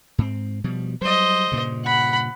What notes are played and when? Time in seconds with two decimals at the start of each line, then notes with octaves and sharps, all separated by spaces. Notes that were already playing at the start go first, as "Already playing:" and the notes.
0.18 G#2 C4
0.64 B2 F3 G3
1.01 F#3 G3 C5 D#5
1.52 G2 A#2 C#3
1.84 F#5 B5